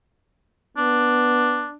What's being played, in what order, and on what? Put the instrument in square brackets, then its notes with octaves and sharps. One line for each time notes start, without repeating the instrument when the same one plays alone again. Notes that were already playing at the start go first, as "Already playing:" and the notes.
[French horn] B3 [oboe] D4